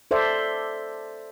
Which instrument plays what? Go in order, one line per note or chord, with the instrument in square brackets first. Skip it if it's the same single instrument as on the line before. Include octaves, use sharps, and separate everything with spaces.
[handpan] A4 C5 D5 E5